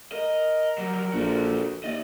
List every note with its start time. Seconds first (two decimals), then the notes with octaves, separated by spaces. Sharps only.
0.12 A#4 D#5
0.78 F#3 G3
1.13 A#1 F#4 A4
1.84 D#2 D5 D#5